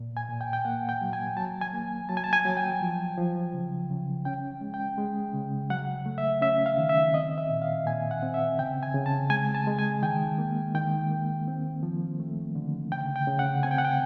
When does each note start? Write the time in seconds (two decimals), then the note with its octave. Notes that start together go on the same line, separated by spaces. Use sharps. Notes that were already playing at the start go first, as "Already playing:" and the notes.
Already playing: A#2
0.17 G#5
0.29 A#2
0.41 G5
0.53 G5
0.65 A#3 F#5
0.89 G5
1.01 F#3
1.13 G#5
1.37 F#3 A5
1.61 G#5
1.73 A#3
2.09 F#3 A5
2.17 G#5
2.24 A5
2.33 G#5
2.45 F#3
2.57 G5
2.81 F3
3.17 F3
3.53 C#3
3.90 C#3
4.25 C#4 G5
4.61 G#3
4.74 G5
4.98 G#3
5.34 C#3
5.70 F#3 F#5
6.06 A3
6.18 E5
6.41 C#4 E5
6.66 F5
6.78 D#3
6.89 E5
7.13 C4 D#5
7.38 E5
7.50 A#2
7.62 F5
7.86 A#2 G#5
8.11 F#5
8.23 C4
8.34 E5
8.59 C#3 G5
8.83 G#5
8.94 C#3
9.06 A5
9.30 G#3 G#5
9.55 A5
9.67 G#3
9.79 G#5
10.02 D#3 G5
10.38 A#3
10.74 D#3 G5
11.11 A#3
11.48 C4
11.83 F3
12.20 A3
12.55 D3
12.92 C#3 G5
13.16 G5
13.27 C#3
13.39 F#5
13.63 C4 G#5
13.71 G5
13.78 F#5
13.85 G5